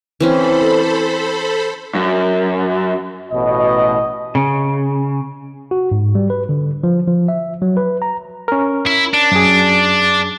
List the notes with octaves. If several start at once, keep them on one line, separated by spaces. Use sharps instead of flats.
E3 C4 C#4 A4 C5 B5
F#2
A1 B2 D#5
C#3
F#4
G#2
G3
B4
D3
F3
F3
E5
F#3
B4
A#5
C#4 A#4
E4
D4
F#2 G#4